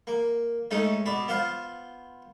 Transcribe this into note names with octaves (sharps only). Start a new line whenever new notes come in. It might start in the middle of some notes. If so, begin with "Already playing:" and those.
A#3
G#3 A3 C#4 D#4 C#5
B2 D5 B5 D6
B3 F4 C5 F5